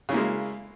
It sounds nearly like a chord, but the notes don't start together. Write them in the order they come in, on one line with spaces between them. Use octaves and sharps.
C#3 E4 A#3 G#3